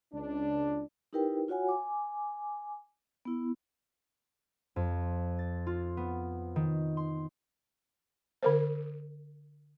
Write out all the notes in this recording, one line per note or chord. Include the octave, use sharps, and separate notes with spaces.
C#2 D4
D#4 E4 G4 A#4 B4 G5
F4 F#4 C#5 F#5 G#5
G#5 D6
B3 E4
F2
A6
F4
B3
D#3
C6
D3 A#4 C5